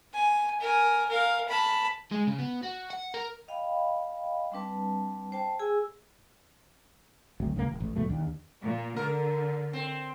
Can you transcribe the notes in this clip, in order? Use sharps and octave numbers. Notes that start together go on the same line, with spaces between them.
G#5
A#4 G#5
A#4 F5
A5 B5
G#3
C#3
B3
F#4
F#5
A#4
D#5 F5 G5 B5
G3 C4 D4 B4 A5
C5 G5 A5
G#4 G#5 E6
A1 D2 F#3 C4
C2 C#3 F#3 A#3
E1
A1
D#2 B2 F#3 A3
D#2 D4
A#2
D3 A#4
C4